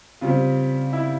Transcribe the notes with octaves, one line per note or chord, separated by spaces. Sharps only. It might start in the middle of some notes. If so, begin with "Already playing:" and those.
C#3 G3 C4 F4
E4